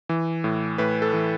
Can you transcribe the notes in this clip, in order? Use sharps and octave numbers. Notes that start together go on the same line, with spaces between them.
E3
A2
A2 B4
A4
E3